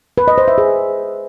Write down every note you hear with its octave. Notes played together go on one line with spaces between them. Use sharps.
B4
D#5
C5
E5
G#4